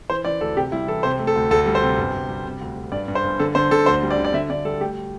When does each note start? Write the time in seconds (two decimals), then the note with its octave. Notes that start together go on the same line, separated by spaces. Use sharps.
0.09 E3 C5
0.25 E3 D5
0.41 D2 A4
0.56 C3 G4
0.72 G3 E4
0.88 E3 A4
1.03 C3 C5
1.19 A3
1.27 A4
1.36 D2
1.51 D2 A4
1.66 G3
1.75 C5
1.83 C3
1.98 G1
2.14 G1
2.29 G3
2.46 C3
2.61 D2
2.77 D2
2.92 G2 D5
3.08 G2
3.15 C5
3.24 G1
3.39 D3 A4
3.55 D3 C5
3.71 D3 A4
3.86 D2 C5
4.03 G3
4.11 D5
4.18 D3
4.25 D5
4.33 D3 E5
4.50 D3 D5
4.65 G3 A4
4.81 A3 G4